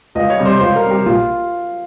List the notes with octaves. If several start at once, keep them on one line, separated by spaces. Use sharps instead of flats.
C#2 D#5
C#5
C3 G3
C5
C#2 C5
A#4
C3 G3
G4
A#1 F4